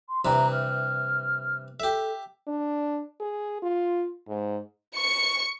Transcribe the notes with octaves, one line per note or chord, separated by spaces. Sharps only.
C6
G2 C3 E3 A#5
F6
G4 A4 E5
D4
G#4
F4
G#2
C#6 C#7